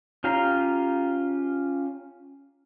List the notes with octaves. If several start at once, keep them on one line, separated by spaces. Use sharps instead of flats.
C#4 F4 G4 F5 A#5